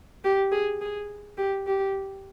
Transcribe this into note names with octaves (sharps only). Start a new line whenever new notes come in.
G4
G#4
G#4
G4
G4